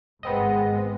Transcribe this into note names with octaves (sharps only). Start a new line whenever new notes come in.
G#1 G#2 G#3 B3 C4 D#5